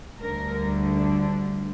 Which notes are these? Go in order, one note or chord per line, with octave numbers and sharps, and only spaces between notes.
D2 D3 G3 A#4
D4